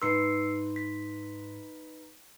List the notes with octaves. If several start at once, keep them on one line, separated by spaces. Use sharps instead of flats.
G#2 D#4 B4 C6 E6 C7 C#7
B6